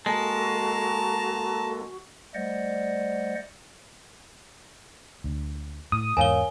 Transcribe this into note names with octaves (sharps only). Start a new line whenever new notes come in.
G#3 A#3 F#4 A4 A5 A#5
G3 A3 C5 D5 D#5 F#5
D2
A2 D#6
E2 G#2 A#4 C#5 F5 G#5 G7